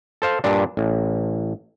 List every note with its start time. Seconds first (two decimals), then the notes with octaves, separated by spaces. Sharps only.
0.22 A4 C5 F5
0.44 G2 A#2 D4
0.77 A1